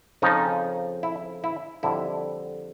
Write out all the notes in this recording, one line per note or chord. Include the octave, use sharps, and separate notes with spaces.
F2 C#3 F3 D#4
E4
E4
F2 D3 G3 E4